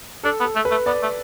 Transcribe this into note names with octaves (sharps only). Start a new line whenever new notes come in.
D4 A4
B3
A4
A3
B4
A3
B3 D5
A3